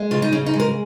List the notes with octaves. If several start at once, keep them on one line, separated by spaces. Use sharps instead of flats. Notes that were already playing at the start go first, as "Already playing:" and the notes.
Already playing: G#3
C#3 F4
D#4
C#3 C#4
D#4
G#3
A#4